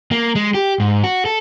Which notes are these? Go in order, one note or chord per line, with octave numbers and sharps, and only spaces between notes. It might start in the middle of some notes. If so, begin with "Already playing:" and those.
A#3
G#3
G4
G#2
F#4
A4